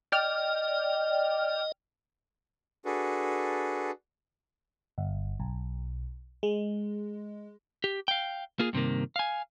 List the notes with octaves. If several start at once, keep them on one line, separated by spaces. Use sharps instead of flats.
D5 D#5 G5 F6
D4 F#4 G#4 A4 B4
G1
B1
G#3
G4
F5 G5
A#3 F4 G#4
G2 C3 D#3 A#3
F5 G#5